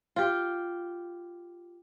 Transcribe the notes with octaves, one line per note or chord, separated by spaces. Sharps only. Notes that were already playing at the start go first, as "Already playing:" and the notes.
F4 G4